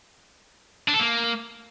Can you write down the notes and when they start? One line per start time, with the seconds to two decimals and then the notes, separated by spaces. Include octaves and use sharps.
0.88 D4
0.94 A4
1.00 A#3